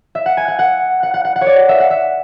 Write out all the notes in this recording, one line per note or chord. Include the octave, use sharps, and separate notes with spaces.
E5
F#5
G#5
F#5
F#5
F#5
F#5
F#5
F#5
C#5
D5
E5
F#5
E5